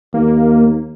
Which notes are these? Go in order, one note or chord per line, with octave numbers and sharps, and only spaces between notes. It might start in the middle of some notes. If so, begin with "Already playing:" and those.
D#2 A#3